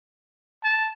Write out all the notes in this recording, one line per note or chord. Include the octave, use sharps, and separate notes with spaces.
A5